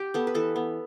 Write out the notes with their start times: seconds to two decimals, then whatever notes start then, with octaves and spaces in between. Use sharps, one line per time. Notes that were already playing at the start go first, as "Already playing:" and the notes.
Already playing: G4
0.14 B3 A4
0.27 B4
0.34 E3 A4
0.56 B3